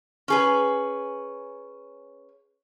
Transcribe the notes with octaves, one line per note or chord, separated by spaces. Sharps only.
C#4 G#4 B4